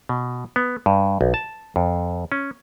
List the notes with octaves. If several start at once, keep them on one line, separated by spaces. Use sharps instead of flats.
B2
B3
G2
B1
A5
F2
C#4